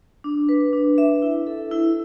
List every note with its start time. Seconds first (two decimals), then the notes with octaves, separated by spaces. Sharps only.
0.24 D4
0.49 B4
0.73 D4
0.98 E5
1.22 E4
1.47 A4
1.71 E4